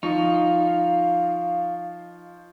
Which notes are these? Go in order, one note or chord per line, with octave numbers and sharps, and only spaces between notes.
F3 D#4 F5 C#6